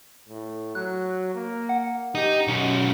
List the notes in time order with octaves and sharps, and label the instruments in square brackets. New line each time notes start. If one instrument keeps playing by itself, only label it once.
[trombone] A2
[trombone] F#3 [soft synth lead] F#6
[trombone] A#3
[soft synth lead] F#5
[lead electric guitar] D#4 [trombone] G4
[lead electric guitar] B1 C#4 [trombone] F#2